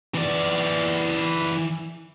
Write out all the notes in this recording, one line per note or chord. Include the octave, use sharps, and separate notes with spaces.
E3 D5